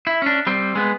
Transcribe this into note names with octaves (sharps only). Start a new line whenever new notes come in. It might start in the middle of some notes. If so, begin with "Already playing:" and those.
E4
C#4 D4
G3 C4
G#3 B3